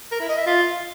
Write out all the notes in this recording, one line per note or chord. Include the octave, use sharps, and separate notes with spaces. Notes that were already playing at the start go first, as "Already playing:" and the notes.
A#4
E4
D#5
E5
F4